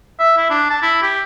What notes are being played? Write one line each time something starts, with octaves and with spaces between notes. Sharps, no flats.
E5
E4
D4
A5
E4
G4